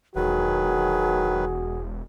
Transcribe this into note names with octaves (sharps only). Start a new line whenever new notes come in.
E1 D#3 F#3 F#4 G#4 B4